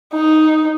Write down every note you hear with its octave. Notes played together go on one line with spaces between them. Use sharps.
D#4